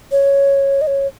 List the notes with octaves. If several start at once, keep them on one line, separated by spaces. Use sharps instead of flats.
C#5
D#5
C#5